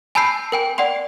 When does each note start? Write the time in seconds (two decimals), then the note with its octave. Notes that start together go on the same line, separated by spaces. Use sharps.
0.15 G#5 A5 B5 E6 G6 C7
0.52 A#4 G5 G#5
0.78 D5 F#5 G5 C6